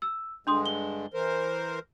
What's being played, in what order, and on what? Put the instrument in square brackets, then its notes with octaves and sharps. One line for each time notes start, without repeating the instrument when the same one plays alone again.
[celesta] E6
[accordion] G2 D3 G#3 [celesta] D4 C6 D#6
[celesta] G7
[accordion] E3 A#4 C5